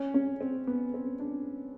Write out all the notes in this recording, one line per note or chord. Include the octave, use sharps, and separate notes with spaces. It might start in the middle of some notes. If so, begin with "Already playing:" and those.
Already playing: C#4
C#4
C4
B3
C4
D4